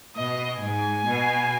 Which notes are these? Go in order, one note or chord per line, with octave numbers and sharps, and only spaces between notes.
B2 D#5
G#2 G#5
B2